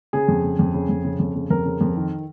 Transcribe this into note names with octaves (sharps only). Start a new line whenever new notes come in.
C#3 G#4
F2
C#3
F2
C#3
F2
C#3
F2
C#3
F2 A#4
C#3
F2
D#3